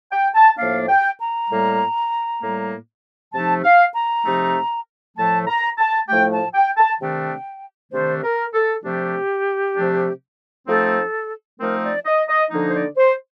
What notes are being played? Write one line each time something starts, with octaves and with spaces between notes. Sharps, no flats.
G5
A5
A2 F3 A#3 D4 F5
G5
A#5
A2 G3 A#3
A2 G3 A#3
C3 F3 A3 D#4 A5
F5
A#5
C3 F3 A3 D#4
A2 F3 A3 A5
A#5
A5
A2 F3 A3 G5
A5
G5
A5
C3 D#3 A3 D4 G5
C3 D#3 A3 D4 C5
A#4
A4
C3 F3 A3 D4 G4
C3 F3 A3 D4
F3 A3 C4 D#4 A4
F3 A3 C4 D#4 A#4
D5
D#5
D#5
D3 F3 A#3 D#4
C5
D5
C5